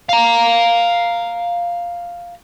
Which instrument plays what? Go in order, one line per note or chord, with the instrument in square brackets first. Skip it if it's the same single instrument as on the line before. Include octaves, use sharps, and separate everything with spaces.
[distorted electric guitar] F5 A#5